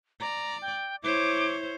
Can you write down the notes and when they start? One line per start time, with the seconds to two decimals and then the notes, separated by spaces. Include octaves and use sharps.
0.20 D5 A#5
0.62 G5
1.03 E4 C5 C#5 D6